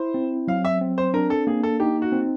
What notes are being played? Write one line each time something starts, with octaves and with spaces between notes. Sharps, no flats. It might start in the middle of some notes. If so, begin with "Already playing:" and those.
Already playing: E4 C5
C4
F#3 F5
E5
C4
C5
D4 A#4
A4
A#3 G#4
A4
D#4 G4
F#4
C4